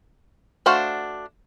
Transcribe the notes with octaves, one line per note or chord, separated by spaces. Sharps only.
A3 D4 F#4 C5 F5